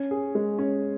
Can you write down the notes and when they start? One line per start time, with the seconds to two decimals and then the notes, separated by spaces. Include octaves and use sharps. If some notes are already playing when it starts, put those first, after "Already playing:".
Already playing: C#4
0.11 G#4
0.35 G#3
0.59 C#4